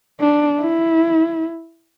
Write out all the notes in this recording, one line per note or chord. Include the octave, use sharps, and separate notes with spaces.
D4
E4